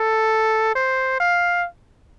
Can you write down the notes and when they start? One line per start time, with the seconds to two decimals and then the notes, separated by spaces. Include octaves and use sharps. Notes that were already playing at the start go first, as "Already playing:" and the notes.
Already playing: A4
0.75 C5
1.20 F5